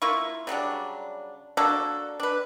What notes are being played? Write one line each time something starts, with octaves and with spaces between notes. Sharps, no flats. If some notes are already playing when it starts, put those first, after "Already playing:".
A#3 E4 F4 C#6
C#3 F#3 G3 D4
A#3 D4 F#4 A4
D4 B4